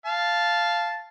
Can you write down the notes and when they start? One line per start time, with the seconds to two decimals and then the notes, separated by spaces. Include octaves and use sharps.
0.05 F5 A5